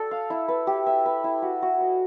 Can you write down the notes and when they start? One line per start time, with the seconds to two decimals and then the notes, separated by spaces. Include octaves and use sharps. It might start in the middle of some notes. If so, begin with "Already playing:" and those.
Already playing: A4 D5
0.11 F5
0.30 E4
0.48 B4
0.67 G4
0.87 E5
1.06 B4
1.24 E4
1.42 F#4
1.62 F#4
1.81 D#5